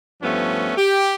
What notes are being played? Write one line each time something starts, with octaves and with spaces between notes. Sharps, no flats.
G2 F3 A3 B3 C#4
G4